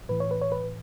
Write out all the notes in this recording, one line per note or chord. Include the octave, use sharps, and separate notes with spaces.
A2 E3 B4
C#5
B4
C#5
B4